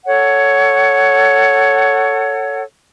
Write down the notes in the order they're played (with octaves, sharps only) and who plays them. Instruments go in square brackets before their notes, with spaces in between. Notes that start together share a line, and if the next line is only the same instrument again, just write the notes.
[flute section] A4 C#5 F#5